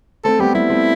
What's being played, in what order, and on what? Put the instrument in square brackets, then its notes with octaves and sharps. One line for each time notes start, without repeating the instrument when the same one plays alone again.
[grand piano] A3 C4 [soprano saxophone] A4
[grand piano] G3 B3 [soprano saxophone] G4
[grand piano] G3 B3 [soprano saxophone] E4
[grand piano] A3 C4